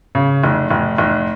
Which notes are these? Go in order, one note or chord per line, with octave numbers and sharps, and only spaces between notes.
C#3
F1
F1
F1